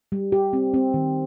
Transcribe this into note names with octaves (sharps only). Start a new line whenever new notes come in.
G3
G4
C4
C4
D#3